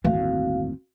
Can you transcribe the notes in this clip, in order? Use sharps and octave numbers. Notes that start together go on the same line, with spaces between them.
G1 D#2 A2 E3 A3 C4 F#4 F5